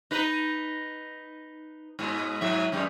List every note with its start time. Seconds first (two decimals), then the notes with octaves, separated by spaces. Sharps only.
0.11 D#4 B4
1.99 G#2 B2 G#3
2.41 G#2 F#3 E5
2.72 F#2 G3 G#3